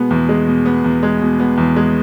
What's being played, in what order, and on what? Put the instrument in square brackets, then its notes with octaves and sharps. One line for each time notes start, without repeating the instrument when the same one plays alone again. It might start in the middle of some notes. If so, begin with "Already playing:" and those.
Already playing: [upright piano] B2 G#3 B3
E2
G#3
B2
B3
E2
G#3
B2
B3
E2
G#3